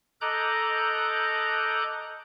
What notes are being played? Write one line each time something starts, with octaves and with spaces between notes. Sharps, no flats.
A4 D#5 A#5 D6 F#6 G6